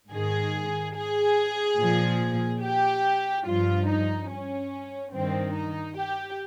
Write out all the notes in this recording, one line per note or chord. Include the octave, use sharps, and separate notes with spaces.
G#2 D#3 G#4
G#4
A#2 F3
G4
G2 F3 F4
D#4
C#4
G2 D#3 C4
D#4
G4